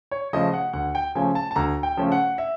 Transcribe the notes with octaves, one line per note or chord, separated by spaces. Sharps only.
C#5
C#3 F3 A3 C#4 D#5
F#5
D2 F#5
G5
C#3 F3 A3 C#4 G#5
A5
A5
D2 A#5
G5
C#3 F3 A3 C#4
F#5
E5